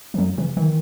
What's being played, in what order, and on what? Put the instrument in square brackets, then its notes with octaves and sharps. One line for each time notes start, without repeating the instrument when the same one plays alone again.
[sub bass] E3
[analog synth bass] F#2 [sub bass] F#3
[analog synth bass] C#3 [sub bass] E3
[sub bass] D#3 [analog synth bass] E3